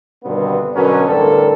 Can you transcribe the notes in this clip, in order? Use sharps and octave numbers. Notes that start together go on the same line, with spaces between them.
G2 B2 D3 D#3 B3 C4
B2 D3 F#3 C#4 A#4 B4
A1 G2 D3 C4 A4 A#4